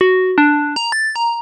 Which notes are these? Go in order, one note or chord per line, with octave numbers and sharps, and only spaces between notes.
F#4
D4
A#5
A6
A#5